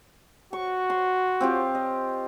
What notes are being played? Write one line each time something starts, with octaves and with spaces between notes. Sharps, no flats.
F#4 C#6
C6
C4 F4 G4
D#5